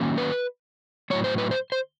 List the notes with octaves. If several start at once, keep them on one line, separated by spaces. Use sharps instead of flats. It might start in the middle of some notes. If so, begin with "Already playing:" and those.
Already playing: D#3 F#3 A#3 C#4
B4
A2 F#3 A#3 C#5
C5
B4
C5
C5